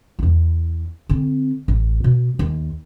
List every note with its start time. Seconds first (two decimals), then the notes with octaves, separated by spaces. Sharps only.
0.19 E2 E4
1.09 D3 C4
1.68 A1
2.04 B2
2.39 D#2